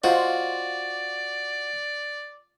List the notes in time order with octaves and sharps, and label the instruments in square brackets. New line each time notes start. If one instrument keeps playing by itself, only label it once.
[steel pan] F4 C5 D#5 [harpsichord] F#4 [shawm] D5